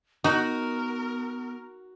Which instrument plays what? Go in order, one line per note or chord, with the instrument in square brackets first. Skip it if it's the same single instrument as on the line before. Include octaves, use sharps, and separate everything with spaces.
[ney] B3 [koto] D#4 [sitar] F#4 [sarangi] A#4